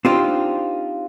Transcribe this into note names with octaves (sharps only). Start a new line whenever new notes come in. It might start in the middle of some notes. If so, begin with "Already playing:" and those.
C4 D4 D#4 F4 G4 C5